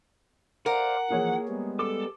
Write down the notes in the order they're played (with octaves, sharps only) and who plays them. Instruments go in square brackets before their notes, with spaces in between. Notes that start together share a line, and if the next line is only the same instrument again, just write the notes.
[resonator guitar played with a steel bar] A#4 [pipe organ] C5 D5 F5 [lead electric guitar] F#5
[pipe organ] E3 F3 [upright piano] A#3 G#4 C#5
[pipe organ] G3 G#3 B3
[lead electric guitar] A4 [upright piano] D6